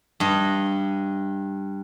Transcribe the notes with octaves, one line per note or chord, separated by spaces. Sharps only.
G2 D#5